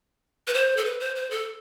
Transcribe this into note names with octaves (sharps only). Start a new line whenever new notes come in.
B4
C5
A4
B4
C5
C5
A4